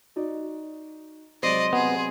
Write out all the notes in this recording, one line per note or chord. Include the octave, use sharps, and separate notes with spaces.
D#4 F#4 D5
C3 F#3 G#3 C5 D5 D#5
C3 F#3 B3 G#4